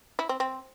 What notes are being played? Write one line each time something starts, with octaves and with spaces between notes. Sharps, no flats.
E4
C4
C4